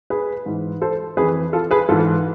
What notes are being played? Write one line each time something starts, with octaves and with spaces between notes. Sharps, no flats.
G#4 B4
G#2 E3
A4 C5
F2 E3 G#4 B4
F4 A4
G#4 B4
G#2 E3 F4 A4